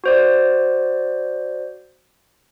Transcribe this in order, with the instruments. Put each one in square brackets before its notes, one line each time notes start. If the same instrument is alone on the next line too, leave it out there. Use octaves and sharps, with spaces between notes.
[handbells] F#4 C5 D5